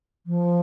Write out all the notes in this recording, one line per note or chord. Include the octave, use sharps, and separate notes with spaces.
F3